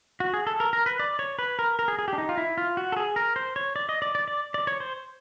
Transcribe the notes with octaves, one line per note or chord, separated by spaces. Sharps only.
F#4
G#4
A4
A#4
A#4
B4
D5
C#5
B4
A#4
A#4
G#4
G#4
G4
D4
D#4
F4
E4
F4
F#4
A4
G#4
A#4
C5
C#5
D5
D#5
D5
D5
D5
D5
C#5
C5